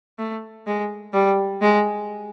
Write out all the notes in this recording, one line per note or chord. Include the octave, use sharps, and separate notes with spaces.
A3
G#3
G3
G#3